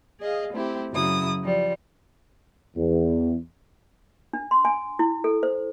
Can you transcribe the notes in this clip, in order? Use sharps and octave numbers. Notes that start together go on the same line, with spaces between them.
G#4 D#5 F5
A3 C4 E4 G4
F#2 C#3 F#3 E4 D#6
F3 G3
E2
D4
C6
G#5
E4
A4
C5